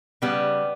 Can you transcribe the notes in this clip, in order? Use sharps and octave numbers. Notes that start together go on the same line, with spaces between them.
C#3 G3 B3